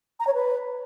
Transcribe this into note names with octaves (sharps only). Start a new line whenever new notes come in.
A#5
C#5
B4